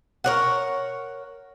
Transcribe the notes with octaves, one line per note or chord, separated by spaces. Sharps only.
A#4 C#5 F#5